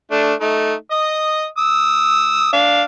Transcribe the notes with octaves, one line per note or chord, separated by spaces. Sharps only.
A3 D4
A3 D#4
D#5 D#6
D#6 E6
D4 F5